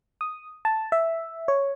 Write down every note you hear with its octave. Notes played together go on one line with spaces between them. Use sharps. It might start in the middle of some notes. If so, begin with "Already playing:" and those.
D#6
A5
E5
C#5